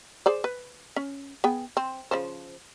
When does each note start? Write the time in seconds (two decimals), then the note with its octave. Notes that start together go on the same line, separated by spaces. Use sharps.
0.26 G#4 C5 D5
0.44 B4
0.96 C#4
1.44 B3 G#4 G5
1.77 C4
2.11 C#3 F3 C5